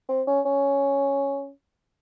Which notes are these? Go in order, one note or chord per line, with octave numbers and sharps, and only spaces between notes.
C4
C#4
C#4